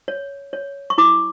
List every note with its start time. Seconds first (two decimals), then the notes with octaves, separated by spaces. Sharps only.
0.08 C#5
0.53 C#5
0.90 C#6
0.98 E4 D6